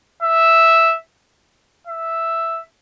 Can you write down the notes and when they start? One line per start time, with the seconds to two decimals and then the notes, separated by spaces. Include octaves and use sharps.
0.23 E5
1.87 E5